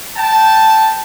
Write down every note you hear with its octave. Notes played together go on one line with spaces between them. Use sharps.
G5 A5